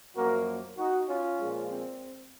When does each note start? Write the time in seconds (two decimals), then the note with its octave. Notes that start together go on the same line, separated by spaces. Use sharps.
0.16 F#2 F3 A#3 F#4 A#4
0.77 D#4 F#4
1.08 C#4 F4
1.39 A#2 F3 G#3
1.70 C4